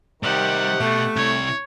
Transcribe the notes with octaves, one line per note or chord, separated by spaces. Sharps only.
C3 D#3 G3 G4 F#5
B2 A3
C3 E4 C#5